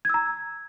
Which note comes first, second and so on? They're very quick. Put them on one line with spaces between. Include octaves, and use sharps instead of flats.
G#6 E6 A#5